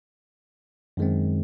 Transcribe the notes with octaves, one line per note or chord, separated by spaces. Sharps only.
F#2 D#3 G#3 C4